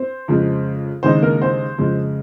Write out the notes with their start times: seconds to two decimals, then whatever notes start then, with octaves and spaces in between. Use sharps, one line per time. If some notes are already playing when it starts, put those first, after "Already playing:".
Already playing: C4 C5
0.28 F2 C#3 G#3
1.03 D#2 C#3 G#3 C4 D#4 C5
1.22 A#3 A#4
1.42 C4 C5
1.78 F2 C#3 G#3